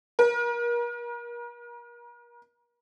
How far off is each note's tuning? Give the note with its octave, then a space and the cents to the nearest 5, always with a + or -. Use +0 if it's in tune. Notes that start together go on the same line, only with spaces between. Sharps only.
A#4 +35